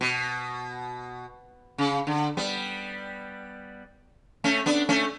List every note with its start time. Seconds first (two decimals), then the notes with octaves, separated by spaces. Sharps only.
0.01 B2
1.78 C#3
2.07 D3
2.37 G3 B3
4.44 A3 C#4
4.66 B3 D4
4.89 A3 C#4